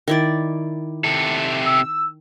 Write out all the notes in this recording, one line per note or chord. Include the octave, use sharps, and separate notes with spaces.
D#3 E4 D5
C3 A4
E6